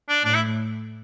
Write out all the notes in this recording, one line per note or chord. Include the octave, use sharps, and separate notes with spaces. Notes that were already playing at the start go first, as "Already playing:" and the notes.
D4
A2 D4
E4